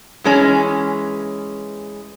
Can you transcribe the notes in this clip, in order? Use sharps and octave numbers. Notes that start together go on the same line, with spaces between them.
E3 G#3 C#4